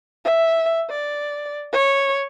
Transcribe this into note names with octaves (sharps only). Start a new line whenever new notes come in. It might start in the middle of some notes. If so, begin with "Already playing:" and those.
E5
D5
C#5